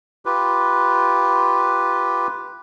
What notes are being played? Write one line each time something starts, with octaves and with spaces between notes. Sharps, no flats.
F4 G4 B4